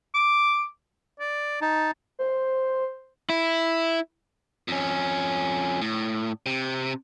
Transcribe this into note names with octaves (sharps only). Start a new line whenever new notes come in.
D6
D5
D#4 A5
C5
E4
F2 C#4
A2
C3